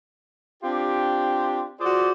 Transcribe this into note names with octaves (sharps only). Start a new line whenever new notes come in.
C4 D4 F4 G4
F4 F#4 G#4 C5 D5